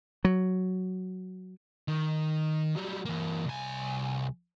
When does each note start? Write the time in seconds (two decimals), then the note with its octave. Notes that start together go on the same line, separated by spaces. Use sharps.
0.25 F#3
1.88 D#3
2.76 F#3 G3
3.05 E3 A#3
3.45 C2 G#5